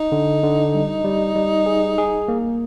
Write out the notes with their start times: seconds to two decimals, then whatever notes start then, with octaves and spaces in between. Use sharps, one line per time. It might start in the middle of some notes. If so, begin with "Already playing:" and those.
Already playing: D#4
0.12 D3
0.43 D3
0.74 G3
1.04 G3
1.35 G3
1.66 G#4
1.98 G#4
2.28 A#3